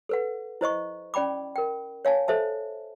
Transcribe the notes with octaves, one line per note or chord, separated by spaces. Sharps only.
A4 B4 F#5
E4 C5 D#5 C#6
C#4 D5 G5 B5 D6
A#4 G5
C#5 F5 G#5 A5
A4 C5 E5 A5